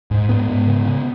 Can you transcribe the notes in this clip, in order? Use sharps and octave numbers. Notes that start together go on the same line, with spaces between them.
G#2
G#2 B3
G#2
C#3
C#3